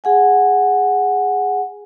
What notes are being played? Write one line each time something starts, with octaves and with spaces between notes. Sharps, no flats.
G#4 F#5 G#5